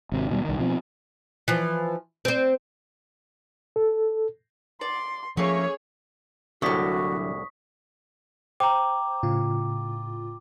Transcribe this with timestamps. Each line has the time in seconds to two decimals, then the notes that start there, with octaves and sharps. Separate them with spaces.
0.12 G#1 C3
0.29 D#2 B2 D#3 G3
0.45 C2 D#3
0.59 B2 F3 C4
1.48 E3 F3
2.25 C4 C5
3.76 A4
4.81 D5 C6
5.37 F3 A3 A#3 C#4 G#4 C#5
6.62 C2 A2 D3 F#3 F#4 C#6 D#6 B6
8.60 C5 G5 A#5 D6
9.23 A2 C#3 F4